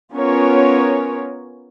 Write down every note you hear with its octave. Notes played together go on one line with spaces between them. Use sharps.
B3 C#4 F4 A#4 C#5